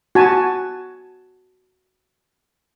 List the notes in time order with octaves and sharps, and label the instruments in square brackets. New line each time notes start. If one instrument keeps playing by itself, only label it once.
[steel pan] F#4 G#5 A5